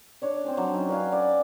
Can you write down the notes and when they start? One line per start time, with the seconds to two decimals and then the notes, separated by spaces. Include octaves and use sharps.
0.22 D4 C#5 D5
0.44 C4 C5 G#5
0.57 F#3 D4
0.73 C#4 D#4
0.89 B4 D5 F5 G#5
1.12 D5